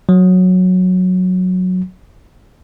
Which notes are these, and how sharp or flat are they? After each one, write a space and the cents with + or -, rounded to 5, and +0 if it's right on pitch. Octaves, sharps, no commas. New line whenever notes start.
F#3 -10